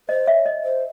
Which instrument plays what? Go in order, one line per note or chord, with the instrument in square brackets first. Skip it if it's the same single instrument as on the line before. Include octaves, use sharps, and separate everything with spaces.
[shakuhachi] C5 [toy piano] D#5
[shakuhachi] C#5 [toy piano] E5
[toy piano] D#5
[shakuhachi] C5